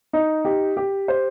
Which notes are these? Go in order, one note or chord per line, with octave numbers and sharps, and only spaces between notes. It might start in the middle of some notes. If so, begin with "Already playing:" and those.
D#4
G4
G4
C5